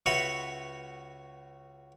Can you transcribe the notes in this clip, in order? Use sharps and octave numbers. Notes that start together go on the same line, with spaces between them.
C#2 F#4 B4 C#5 E5 C6